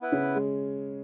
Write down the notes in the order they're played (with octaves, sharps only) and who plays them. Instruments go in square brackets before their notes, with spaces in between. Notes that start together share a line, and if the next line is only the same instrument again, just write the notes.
[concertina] B3 E4 B4
[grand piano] C#3 C#4
G#3